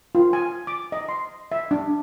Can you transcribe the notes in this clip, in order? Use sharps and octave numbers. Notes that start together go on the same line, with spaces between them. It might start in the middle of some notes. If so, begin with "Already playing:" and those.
F4
G#5
D6
D#5
C6
E5
D4